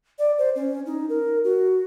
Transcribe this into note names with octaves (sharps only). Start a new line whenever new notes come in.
D5
C5
C#4
D#4
A#4
F#4